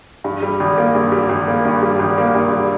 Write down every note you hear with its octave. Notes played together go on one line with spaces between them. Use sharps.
G2
G3
G#1
A#3
G2
G3
G#1
A#3
G2
G3
G#1
A#3
G2
G3